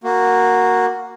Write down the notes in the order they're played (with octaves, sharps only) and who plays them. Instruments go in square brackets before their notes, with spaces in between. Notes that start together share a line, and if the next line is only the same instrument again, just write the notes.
[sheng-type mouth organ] A#3 F#4